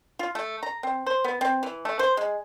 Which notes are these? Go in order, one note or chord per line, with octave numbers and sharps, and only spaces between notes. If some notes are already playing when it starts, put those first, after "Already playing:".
F4
A3
A#5
C4
C5
B3
C4
E3
A3
C5
G#3